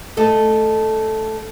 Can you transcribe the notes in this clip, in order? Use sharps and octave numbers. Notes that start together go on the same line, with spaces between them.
A3 A4 D#5